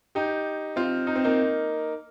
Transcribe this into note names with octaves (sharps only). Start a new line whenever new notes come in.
D#4 G4
C4 F4
D#4
C4
A#3 D#4